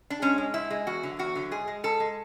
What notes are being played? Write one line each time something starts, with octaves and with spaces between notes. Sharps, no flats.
D4
G#2 C#4
G#3
G#2 E4
G#3
E2 F#4
D3 F#3
E2 F#4
D3 F#3
G#2 G#4
G#3
G#2 A4
G#3